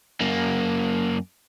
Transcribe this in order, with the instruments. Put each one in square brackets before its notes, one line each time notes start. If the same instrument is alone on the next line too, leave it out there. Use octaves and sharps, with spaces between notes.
[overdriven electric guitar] F#2 A#3